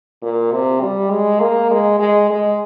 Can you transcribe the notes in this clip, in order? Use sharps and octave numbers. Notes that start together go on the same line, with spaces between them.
A#2
C3
G3
G#3
A#3
G#3
G#3
G#3